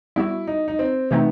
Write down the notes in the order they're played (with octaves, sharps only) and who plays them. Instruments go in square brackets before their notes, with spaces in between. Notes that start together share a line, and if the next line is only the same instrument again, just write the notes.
[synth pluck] G3 B3 F#4 [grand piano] E4
[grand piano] D#4
D#4
C4
[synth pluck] C3 E3 A3 C4 D#4 [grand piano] B3